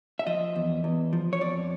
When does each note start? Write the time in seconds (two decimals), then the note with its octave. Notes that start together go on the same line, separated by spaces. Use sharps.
0.19 E5
0.27 F3 D#5
0.56 E2
0.84 E2
1.13 F3
1.33 C#5
1.41 F2 D5